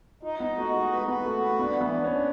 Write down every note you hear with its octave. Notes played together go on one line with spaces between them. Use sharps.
D#4 F4
B3 D#4
A3 F#4
G#3 D#4
B4
B3 B4
A3 F#4
A3 B4
B3 D4
E3
B3
D4
C#4
D4